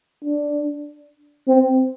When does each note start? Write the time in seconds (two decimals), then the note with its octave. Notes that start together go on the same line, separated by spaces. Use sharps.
0.25 D4
1.48 C4